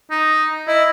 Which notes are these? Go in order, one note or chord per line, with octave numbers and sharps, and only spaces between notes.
D#4
E4 D#5